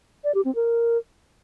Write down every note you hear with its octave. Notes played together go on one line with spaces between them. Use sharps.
D5
G4
C4
A#4